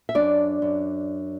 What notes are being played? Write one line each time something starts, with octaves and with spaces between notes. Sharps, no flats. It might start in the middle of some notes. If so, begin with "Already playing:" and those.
E5
F#2 D4 D5
F#2